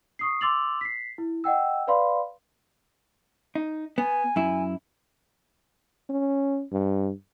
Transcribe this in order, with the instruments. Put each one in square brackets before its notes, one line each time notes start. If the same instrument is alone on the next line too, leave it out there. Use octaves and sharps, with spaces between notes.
[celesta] C#6 D#6 C7
C6 D6 E6 A6 F7 F#7
B6 C7
E4
D#5 F#5 G5 E6
B4 D5 F5 B5 C6
[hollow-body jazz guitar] D#4
[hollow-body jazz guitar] B3 [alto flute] G#5
[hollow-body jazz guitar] F#2 E4
[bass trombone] C#4
G2